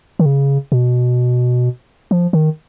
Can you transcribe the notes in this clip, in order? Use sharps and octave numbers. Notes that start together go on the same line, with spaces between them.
D#3
C#3
B2
F3
D#3